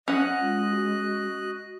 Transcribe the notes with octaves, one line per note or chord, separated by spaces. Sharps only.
C#4 D#5 F#5 F#6
G#3 F4
F#4